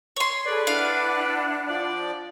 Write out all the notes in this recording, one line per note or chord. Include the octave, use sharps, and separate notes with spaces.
C#5 C6
G#4 A4 B4 D5
D4 E4 F5 F#5
F3 D5